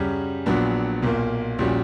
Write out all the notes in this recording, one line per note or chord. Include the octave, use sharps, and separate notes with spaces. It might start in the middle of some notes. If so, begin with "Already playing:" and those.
Already playing: F#2 C#3 G3 C#4
A#1 A#2 F#3 B3 D4
B1 A#2 A#3
A#1 A#2 G3 C#4 F#4